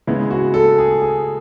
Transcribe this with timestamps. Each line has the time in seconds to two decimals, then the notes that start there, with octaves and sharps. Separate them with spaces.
0.07 C#3 G#3 B3 E4
0.30 F#4
0.54 A4
0.78 G#4
1.02 G#4